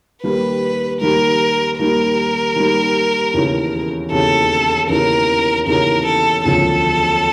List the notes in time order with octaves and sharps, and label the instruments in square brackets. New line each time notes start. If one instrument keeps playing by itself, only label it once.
[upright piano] D#2 D#3 G3 A#3 [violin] B4
[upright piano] D#2 D#3 G3 A#3 [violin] A#4
[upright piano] D#2 D#3 G3 A#3 [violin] A#4
[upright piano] D#2 D#3 G3 A#3
E1 D#2 C#3 E3
[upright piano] E1 D#2 C#3 E3 [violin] A4
[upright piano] E1 D#2 C#3 E3 [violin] A#4
[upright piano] E1 D#2 C#3 E3 [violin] A#4
[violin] A4
[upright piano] E1 D2 C#3 F3 [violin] A4